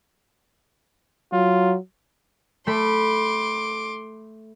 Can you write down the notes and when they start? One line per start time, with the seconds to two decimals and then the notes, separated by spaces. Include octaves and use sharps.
1.33 F#3 F4
2.67 A3 B5 C6 D6